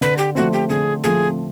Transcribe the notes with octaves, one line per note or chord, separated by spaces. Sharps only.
D3 B4
G4
F3 A3 C4 F#4
G4
D3 G#4
F3 A3 C4 G#4